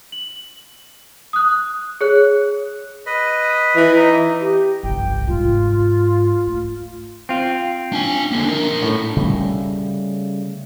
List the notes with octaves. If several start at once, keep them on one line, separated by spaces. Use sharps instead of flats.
F#7
D#6 F#6
G#4 C#5 F#6
B4 D#5
E3
D#4 D#5
G4
G1 C2 G5
G#2 F4
A3
C4 F4
D4 G#5
D3 A#3
D4 A#4
A2
C#3 G3 A3